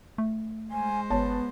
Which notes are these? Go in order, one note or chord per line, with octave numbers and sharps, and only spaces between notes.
A3
G#3 C5 G#5
G1 B3 C#5 A5